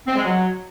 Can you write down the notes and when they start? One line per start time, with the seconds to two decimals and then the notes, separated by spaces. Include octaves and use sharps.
0.07 C4
0.16 G#3
0.25 F#3